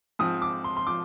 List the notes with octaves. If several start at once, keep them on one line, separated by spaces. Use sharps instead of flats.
G#2 F3 C4 D#6
D6
C6
C6
F3 D6